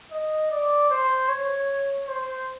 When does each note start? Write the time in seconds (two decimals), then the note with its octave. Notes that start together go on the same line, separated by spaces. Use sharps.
0.12 D#5
0.51 D5
0.90 C5
1.29 C#5
2.08 C5